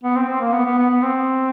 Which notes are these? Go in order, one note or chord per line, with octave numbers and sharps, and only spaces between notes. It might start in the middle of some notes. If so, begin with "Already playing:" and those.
B3
C4
C4
A#3
B3
B3
B3
B3
C4